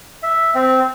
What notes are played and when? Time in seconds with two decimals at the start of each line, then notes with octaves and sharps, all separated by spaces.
0.23 E5
0.55 C4